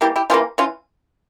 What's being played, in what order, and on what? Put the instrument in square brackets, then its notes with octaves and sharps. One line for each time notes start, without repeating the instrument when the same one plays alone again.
[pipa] E3 G3 A#3 E4 G4
E4 G4
C3 E3 G3 A#3 C#4 F4
E3 C#4 F4